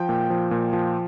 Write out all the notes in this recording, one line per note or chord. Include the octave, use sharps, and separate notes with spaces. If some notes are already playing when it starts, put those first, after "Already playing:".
Already playing: F3 G5
A#2
F3
A#2
F3